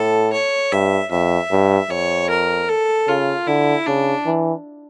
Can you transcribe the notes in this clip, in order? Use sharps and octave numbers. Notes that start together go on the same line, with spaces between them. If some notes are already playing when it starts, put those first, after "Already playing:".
Already playing: A2 A4
C#5
G2 E5
F2 E5
G2
F2 C#5
A#4
A4
C#3 F4
D3 E4
C#3 D4
E3